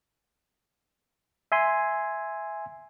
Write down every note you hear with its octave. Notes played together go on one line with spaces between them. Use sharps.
E5 G#5 C6